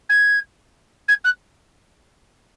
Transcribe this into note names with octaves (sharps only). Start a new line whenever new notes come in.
G#6
G#6
F#6